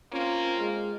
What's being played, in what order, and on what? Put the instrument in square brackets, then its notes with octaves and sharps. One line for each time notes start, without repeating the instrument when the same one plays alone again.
[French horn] A#3 [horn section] C4 F4 [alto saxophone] C#4
[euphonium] G#3 [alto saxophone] F5